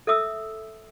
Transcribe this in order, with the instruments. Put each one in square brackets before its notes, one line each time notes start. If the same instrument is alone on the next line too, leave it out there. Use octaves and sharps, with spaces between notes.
[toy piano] A4 E5 D#6 E6